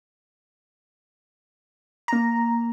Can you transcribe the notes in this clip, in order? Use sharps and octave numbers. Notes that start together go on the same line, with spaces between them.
A#3 A#5